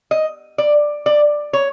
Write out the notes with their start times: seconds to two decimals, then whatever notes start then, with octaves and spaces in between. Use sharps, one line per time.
0.11 D#5
0.58 D5
1.06 D5
1.53 C#5